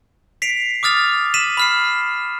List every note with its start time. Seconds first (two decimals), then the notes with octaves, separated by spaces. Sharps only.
0.42 B6 C7 D7 F7
0.83 D6 D#6 F6 A6 F7
1.34 B6 D#7 E7 F#7
1.57 B5 F6 C7